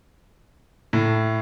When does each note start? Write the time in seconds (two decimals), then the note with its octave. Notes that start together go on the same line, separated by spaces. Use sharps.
0.93 A2